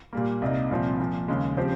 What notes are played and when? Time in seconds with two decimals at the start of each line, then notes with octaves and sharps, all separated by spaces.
0.13 A#2 G3 A#3
0.42 C2 C3 G3 A#3 D#4
0.71 C2 A#2 F3 C4
1.00 A#2 F3 A#3
1.28 D#2 C#3 G#3
1.57 C#3 F3 C4 G4 C5